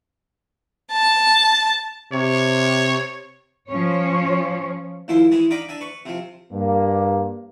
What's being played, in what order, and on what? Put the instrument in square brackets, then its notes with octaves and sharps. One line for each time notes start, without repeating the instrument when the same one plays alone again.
[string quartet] A5
[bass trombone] C3 [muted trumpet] C#5
[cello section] F3 C#4 C#5
[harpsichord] D#2 F3 E4 C6
E3 G#3 E4 G#4
D4 D#4 D#5 F5 B5 D6
D4 E5 G#5
B4 C#6
C3 F3
[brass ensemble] G2 A#3